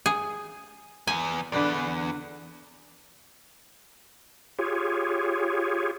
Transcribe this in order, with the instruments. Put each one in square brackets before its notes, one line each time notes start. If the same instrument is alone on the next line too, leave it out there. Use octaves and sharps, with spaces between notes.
[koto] G#4
[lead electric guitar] E2 [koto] G#5
[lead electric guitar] E2 [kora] D3 B4 D5
[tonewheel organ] F4 G4 G#4 C#5